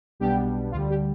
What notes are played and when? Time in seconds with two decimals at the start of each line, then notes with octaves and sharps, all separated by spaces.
0.20 B1 B2 G3 B3 D4 G4
0.71 D2 D3 G3 F4
0.89 G4